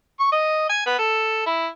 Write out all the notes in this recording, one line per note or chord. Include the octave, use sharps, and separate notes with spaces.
C#6
D#5
G#5
B3
A4
E4